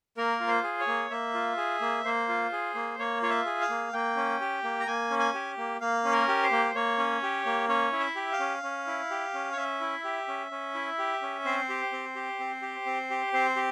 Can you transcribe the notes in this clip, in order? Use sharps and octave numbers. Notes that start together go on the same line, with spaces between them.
A#3 A#4
F4
C5
G#4
C#5
A#3
A#3 E5
F4
G#4
A#3
A#3 C5
F4
G#4
A#3
A#3 C#5
F4 C#5
E5
G#4
F5
A#3
A#3 G5
C#4
G4
A#3
A#5
A#3 G#5
C#4
G#5
G4
A#3
A#3 F5
C#4
A#4
G4
C5
A#3
A#3 C#5
C#4
G4
A#3
C#4 C#5
E4
E5
G4
F5
C#4
C#4
E4
G4
C#4
C#5
C#4 E5
E4
G4
C#4
C#4
E4
G4
C#4
C4 C5
G4
C4
G4
C4
G4
C4
G4
C4 C5
G4